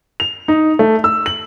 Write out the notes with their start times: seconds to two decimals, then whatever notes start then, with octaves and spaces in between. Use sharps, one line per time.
0.20 F7
0.48 D#4
0.79 A3
1.04 E6
1.26 F#7